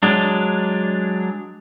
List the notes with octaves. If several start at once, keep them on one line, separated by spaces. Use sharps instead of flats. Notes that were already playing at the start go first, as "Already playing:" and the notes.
F#3 G#3 D4